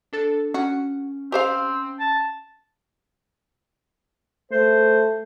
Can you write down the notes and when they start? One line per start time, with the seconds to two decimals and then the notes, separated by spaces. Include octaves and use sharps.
0.13 D4 A4 A6
0.54 C#4 F#4
1.32 C4 G4 C5 F5
1.99 A5
4.52 A3 C5